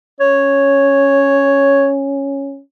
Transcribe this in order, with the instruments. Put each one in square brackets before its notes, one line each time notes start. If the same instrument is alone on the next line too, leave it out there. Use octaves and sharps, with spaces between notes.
[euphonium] C#4 [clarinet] C#5